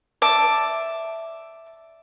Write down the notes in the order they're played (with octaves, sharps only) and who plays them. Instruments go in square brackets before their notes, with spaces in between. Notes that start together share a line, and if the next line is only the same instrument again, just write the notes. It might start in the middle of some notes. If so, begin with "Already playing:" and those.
[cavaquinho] D5 E5 A5